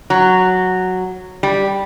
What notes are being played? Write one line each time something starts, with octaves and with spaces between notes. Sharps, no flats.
F#3
G3